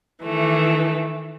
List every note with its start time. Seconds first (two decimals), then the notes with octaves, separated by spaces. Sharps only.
0.24 D#3 E3 A3